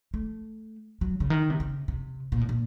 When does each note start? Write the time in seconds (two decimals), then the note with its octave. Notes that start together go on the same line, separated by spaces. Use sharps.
0.14 A3
1.01 F#3
1.20 C#3
1.30 D#3
1.50 C3
1.60 C#3
1.88 C3
2.32 A#2
2.41 A2
2.49 A#2